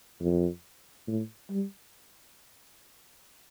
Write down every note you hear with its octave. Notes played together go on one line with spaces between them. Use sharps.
F2
A2
G3